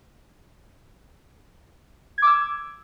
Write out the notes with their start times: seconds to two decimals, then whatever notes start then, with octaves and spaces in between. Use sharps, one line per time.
2.18 G#6
2.22 D6
2.27 E6